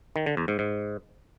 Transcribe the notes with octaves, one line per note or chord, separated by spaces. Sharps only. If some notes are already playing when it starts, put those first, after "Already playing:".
D#3
D3
E2
G#2
G#2